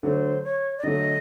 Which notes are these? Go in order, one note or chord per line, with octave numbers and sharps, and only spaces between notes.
D3 F#3 A3 C5
C#5
D5
D3 F#3 A3 D#5